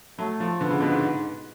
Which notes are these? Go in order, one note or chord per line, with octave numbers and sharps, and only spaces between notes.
F#3 A3
F3
D3 B3
C#3
B2
G#2